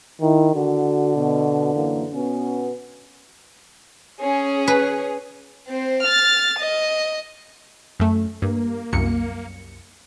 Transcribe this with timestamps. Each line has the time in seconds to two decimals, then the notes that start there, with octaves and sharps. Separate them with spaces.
0.21 D#3 E4
0.55 D3 F#4
1.15 B2
1.74 F#2 E3 A#3
2.12 B2 B3 C#4
4.22 C#4 G#4
4.68 B4
5.68 C4 C5
6.03 F6 A6
6.59 D#5
8.00 F#2 A3
8.42 G2 A#3
8.93 C2 F#2 C#7